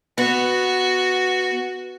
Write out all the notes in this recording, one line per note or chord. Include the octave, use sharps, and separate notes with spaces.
B3 F#4